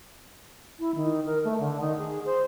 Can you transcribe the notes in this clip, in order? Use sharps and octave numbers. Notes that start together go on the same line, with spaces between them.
E4
D#3
A#4
A3
D3
D#3
G#4
C5